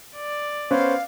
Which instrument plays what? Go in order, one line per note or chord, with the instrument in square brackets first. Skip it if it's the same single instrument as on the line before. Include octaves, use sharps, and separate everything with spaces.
[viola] D5
[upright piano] B3 C#4 B4 [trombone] C5 [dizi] F5